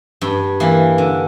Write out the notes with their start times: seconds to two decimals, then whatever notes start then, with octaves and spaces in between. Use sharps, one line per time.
0.21 G2
0.60 E3 A#3
0.98 D3